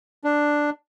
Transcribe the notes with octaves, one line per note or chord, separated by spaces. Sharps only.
D4